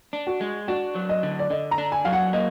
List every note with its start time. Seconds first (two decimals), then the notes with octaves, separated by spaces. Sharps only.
0.13 D4
0.27 F#4
0.41 G#3
0.68 D4 F#4
0.95 F#3
1.09 D#5
1.23 D3
1.39 D5
1.50 D3 D#5
1.71 A#5
1.78 D4
1.92 G#5
2.05 F#3 F5
2.13 F#5
2.33 A#3 D#5